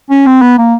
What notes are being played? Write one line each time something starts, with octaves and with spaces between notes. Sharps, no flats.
C#4
C4
B3
A#3